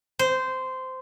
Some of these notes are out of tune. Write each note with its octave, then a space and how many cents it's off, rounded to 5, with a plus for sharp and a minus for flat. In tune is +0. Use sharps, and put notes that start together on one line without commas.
C5 -15